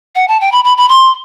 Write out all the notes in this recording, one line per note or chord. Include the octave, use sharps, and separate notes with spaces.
F#5
A5
G5
B5
B5
B5
C6